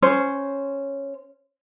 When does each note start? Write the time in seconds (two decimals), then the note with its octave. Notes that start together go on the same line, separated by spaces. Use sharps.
0.02 C#4 C5